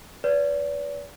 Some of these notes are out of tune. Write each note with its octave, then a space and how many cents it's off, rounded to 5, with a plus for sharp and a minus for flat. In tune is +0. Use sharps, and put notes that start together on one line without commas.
B4 +0 D5 -40